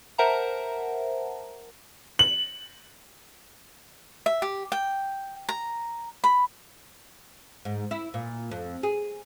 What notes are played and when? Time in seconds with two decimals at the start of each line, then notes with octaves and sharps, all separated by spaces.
0.18 A#4 C5 E5 F#5 A5 A#5
2.19 F#7
4.26 E5
4.42 G4
4.72 G5
5.49 A#5
6.24 B5
7.65 G#2
7.91 E4
8.14 A#2
8.51 F2
8.83 G#4